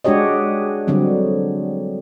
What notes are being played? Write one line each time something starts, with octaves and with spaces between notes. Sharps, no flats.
G#3 D4 F#4 G4 C#5 D#5
D3 F#3 G3 C4